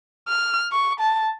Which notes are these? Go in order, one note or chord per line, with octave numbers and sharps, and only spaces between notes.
F6
C#6
A5